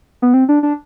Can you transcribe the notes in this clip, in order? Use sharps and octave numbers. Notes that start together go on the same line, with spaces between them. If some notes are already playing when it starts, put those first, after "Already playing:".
B3
C4
D4
D4